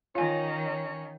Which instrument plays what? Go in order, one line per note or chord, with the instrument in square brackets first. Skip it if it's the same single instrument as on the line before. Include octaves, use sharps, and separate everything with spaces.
[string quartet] D#3 [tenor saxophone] C#4 [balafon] F4 G#5 [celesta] C#5 F5